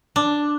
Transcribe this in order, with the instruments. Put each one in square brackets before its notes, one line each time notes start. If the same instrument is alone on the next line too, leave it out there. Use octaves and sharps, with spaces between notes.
[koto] D4